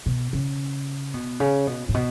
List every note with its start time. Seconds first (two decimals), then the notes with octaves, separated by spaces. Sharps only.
0.06 B2
0.33 C#3
1.14 B2
1.40 C#3
1.67 B2
1.89 A2
1.94 B2